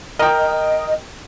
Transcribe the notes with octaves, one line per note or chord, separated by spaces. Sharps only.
A#4 D#5 G5